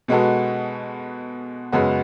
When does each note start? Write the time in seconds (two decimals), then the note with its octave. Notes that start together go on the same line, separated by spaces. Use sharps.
0.08 B2 G#3 B3 F#4 A4
1.72 F#2 C#3 G#3 B3 F#4